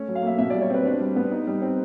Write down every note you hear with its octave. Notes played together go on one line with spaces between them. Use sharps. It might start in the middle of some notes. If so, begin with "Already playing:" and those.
Already playing: A3 C#4
F#3
F5
A#3 E5
B2 E5
D5
G3
C#5
C4 B4
D4
G3
B3
D#4
G3
C4